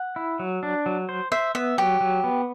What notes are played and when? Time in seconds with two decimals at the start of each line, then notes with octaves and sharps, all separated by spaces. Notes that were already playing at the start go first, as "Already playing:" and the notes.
Already playing: F#5
0.16 E4
0.39 F#3
0.63 D4
0.86 F#3
1.09 C5
1.32 C5 E5
1.55 B3 E5
1.78 F#3 G4
2.01 F#3
2.24 B3